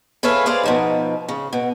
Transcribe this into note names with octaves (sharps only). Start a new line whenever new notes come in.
G#4 A4 B4 C#5 E5 F5
G#4 C5 D5 F5
B2 F3 D#4
C#3
B2